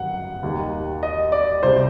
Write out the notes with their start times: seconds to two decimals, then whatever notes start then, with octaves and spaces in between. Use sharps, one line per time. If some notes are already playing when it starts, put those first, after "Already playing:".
Already playing: G1 F#2 D#3 G3 F#5
0.43 D#2 D#3 G3
1.03 D#5
1.32 D5
1.63 C2 C3 G3 C5